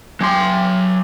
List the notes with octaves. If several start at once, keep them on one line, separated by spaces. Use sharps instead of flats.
F#3 G4 G#5 C6